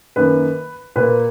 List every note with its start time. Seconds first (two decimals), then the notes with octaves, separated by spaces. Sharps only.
0.16 F#2 D#3 A#3 B4
0.96 A#2 A#3 B4